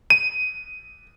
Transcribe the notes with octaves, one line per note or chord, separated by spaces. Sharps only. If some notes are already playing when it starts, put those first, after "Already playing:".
D#7